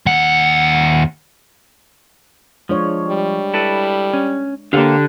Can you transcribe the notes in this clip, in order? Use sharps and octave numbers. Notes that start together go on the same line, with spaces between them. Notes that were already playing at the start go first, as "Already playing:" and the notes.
D#2 F#5
F3 G#3 D4 C#5
G3
E4 A4 B4
C#4
D3 A#3 G4 C5 F5